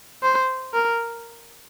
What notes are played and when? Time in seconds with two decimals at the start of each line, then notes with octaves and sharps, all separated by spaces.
0.23 C5
0.74 A#4